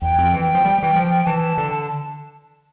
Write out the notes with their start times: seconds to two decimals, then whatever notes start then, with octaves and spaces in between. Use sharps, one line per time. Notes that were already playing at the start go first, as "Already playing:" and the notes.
0.02 E2 G5
0.18 F2
0.33 E3
0.55 F3
0.65 G3
0.83 E3
0.96 F3
1.26 E3 A5
1.58 D3